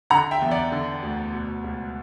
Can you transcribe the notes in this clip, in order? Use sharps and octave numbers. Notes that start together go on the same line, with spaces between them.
D3 F#5 A#5
E5 G5
E2
D5 F#5
D3
D2
B2
C#2